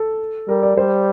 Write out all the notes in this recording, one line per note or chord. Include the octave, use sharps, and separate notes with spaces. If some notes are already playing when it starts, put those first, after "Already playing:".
Already playing: A4
G3 A#4
D5
G3 C5